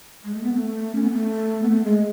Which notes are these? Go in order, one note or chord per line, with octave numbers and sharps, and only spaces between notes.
G#3
A3
B3
A3
C#4
B3
A3
B3
A3
G#3